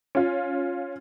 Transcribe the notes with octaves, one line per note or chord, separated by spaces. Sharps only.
C#4 F4